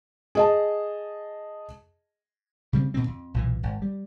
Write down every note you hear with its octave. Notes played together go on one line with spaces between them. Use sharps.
G#4 D#5 A5
C#3 G3 A3 C4
B2 D#3 C4
F2
B1 A#2 E3
G#1
G3